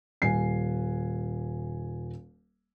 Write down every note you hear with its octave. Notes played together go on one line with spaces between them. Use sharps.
D#1 G#5 C7